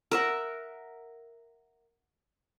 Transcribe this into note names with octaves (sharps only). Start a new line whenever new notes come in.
A#4 E5 F#5